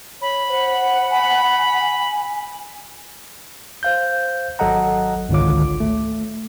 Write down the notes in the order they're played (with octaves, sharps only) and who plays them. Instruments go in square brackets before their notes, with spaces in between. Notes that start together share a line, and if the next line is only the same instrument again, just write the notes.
[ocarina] C#5 [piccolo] B5
[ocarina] C5 [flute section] F#5
[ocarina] G#5 [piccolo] B5
[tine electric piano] C5 F5 G6
G#1 F#3 A4 D#5 F#5 A#5
G#1 C#2 D3 F4 C#5 D6
A3